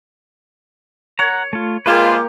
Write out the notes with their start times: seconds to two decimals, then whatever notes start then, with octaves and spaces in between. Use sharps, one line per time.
1.19 C#5 F#5 A#5
1.53 A3 F4
1.86 G#3 A#3 F4 G4 B4 C5 D5